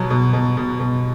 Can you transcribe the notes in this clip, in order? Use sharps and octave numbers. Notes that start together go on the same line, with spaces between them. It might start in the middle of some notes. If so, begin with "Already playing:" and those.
Already playing: B2 F#3
B2
B2
B2
B2